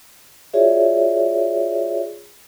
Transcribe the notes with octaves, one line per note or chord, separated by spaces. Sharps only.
F4 F#4 G#4 C#5 D5 E5